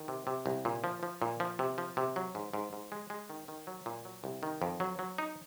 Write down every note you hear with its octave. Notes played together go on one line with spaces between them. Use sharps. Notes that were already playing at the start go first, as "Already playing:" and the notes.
Already playing: D#3
C3
C3
C2
A#2
F3
F3
A#2
F3
C3
F3
C3
F#3
G#2
G#2
G#2
G#3
G#3
D#3
D#3
F#3
A#2
F#3
C2
D#3
F2
F#3
F#3
D#4